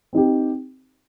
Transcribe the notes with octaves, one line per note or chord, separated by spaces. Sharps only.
C4 D#4 G4